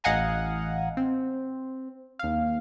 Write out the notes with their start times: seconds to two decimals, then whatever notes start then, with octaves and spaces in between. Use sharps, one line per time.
0.04 A1 D#5 F5 F#5 G#5 A#5
0.97 C4
2.19 D#2 F5